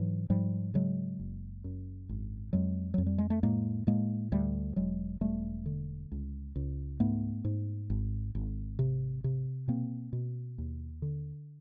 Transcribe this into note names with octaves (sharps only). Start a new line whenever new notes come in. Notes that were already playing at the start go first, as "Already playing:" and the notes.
Already playing: G#2 E3 F#3
G#2 F3 G3
C#3 F#3 G#3
F#1
F#2
G#1
F2 F#3 G#3
F2 F#3
G3
G#3
A3
A2 G#3 A#3
A2 G#3 A#3
D2 G3 A3
E1 F#3 G#3
E1 G3 A3
D3
C#2
C#2
G#2 A3 B3
G#2
G#1
G#1
C3
C3
B2 A#3 C4
B2
D#2
D3